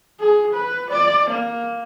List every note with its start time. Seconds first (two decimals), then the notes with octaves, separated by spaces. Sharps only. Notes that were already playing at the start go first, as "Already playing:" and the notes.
0.20 G#4
0.54 B4
0.90 D5
1.30 A#3